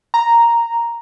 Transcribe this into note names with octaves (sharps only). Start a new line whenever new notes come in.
A#5